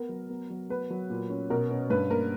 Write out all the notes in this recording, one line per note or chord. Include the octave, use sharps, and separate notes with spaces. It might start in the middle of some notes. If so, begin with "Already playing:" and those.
Already playing: B3 A#4
F#3
B3
F#3
B3 B4
F#3
A#2
C#4
B2 A#4
C#4
G2 B4
A#3 A#4